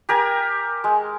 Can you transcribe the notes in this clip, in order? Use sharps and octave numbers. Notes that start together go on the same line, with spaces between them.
G4 A#4 G#5
G#3